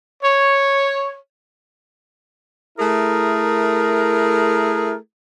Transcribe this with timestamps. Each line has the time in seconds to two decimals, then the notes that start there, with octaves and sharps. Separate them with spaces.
0.23 C#5
2.78 A3 E4 G#4 A#4